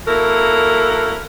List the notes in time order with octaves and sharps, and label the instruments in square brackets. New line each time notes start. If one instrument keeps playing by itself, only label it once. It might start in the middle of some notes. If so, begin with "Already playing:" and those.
[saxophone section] A#3 E4 F#4 A4 A#4